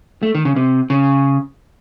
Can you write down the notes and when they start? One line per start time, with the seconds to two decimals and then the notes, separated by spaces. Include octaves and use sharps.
0.23 A3
0.35 D#3
0.45 C#3
0.56 C3
0.90 C#3